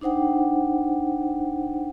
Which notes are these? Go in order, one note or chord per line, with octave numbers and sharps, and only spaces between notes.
D4 D#4 C5 F#5 G5